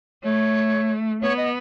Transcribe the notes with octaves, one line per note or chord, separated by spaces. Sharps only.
A3 C#5
B3 C#5
D#5